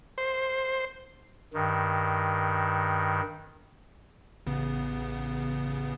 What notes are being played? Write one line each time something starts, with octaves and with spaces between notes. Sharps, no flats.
C5
G2 D#3
A1 C#3 B3